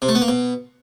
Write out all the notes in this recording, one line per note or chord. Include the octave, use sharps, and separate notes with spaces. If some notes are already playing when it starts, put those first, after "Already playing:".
C3
A3
B3
A#3
B2